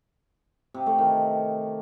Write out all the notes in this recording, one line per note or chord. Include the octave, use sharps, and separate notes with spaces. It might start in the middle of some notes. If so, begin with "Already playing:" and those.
C3
A3
D#3